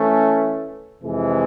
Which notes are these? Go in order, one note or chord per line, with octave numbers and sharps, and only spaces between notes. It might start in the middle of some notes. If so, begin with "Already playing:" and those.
Already playing: E3 A3 C#4
F2 C3 E3 G#3